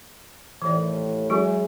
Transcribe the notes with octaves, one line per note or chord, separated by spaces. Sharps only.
D#2 A2 E3 D5
F#3 G#3 C#4 E4 F#4 G#4